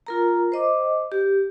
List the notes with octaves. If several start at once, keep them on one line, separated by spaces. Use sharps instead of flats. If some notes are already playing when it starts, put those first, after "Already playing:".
F4 A#4 A#5
C5 D#5 D6
G4